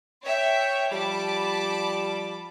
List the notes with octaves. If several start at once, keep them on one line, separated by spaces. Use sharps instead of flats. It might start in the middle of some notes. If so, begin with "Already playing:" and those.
C#5 E5 G5
F3 G3 A5 B5 D6